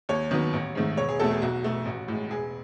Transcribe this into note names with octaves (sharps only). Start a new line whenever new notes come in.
D#2 C#5
D#3 F#3 B3
A1
G#2 D#3 A3
E1 C#5
G#4
E2 B2 A3 A4
G#4
B1 F#4
B2 A3
A1
A2 G#3
E1 G#4